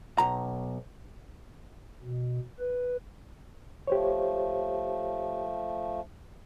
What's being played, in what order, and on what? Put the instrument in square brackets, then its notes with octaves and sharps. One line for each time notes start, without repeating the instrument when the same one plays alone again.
[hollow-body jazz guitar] B1 A#5
[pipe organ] B2
B4
[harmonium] F3 A3 [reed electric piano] G4 C5 C#5